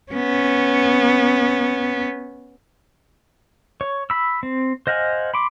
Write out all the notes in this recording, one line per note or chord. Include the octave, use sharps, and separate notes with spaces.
B3 C#4
C#5
B5 E6
C4
C5 D#5 F5 F#5 G#5
B5 C6 D6